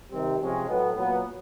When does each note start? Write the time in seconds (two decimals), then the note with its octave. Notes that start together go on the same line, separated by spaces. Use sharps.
0.11 C3 D#3 G3 C4
0.39 C3 F3 G#3 C#4
0.68 A2 F#3 B3
0.96 A#2 F#3 B3